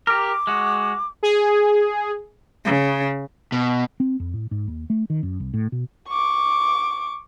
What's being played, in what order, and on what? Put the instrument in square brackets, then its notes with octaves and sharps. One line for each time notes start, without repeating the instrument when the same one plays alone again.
[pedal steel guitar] G4 A#4 [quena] D6
[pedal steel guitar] G#3 F#4
[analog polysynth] G#4
[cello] C#3
[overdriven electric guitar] B2
[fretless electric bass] C4
F2
A2
G#2
D#2
A3
D#3
F#2
C2
A2
B2
[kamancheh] C#6 D6